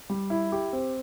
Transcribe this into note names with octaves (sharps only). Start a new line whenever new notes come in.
G3
E4
G4
C4